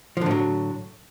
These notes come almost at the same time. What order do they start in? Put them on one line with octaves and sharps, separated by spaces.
F3 D3 A2 F#3